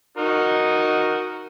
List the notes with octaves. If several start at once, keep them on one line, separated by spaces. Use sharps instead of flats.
D#4 F#4 A#4